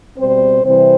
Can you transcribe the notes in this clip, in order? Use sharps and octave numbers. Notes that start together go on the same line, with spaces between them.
B2 G3 C4 C5
C3 E3 G3 C4 C5